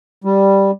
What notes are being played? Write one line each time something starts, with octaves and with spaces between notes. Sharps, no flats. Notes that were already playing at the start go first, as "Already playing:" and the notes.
G3